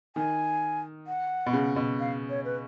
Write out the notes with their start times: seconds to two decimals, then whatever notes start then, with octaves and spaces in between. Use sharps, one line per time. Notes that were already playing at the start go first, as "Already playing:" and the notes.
0.16 D#3 G#5
1.07 F#5
1.46 B2
1.53 C#3
1.76 B2
2.00 F5
2.30 C#5
2.45 B4